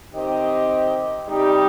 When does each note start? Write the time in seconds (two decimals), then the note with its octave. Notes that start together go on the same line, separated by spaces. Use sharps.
0.13 D#3 C4 G4 C5 D#5
1.27 C3 G3 D#4 G4